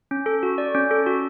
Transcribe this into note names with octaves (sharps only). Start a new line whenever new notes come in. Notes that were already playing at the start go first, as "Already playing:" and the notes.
C#4
A4
F#4
D5
C#4
A4
F#4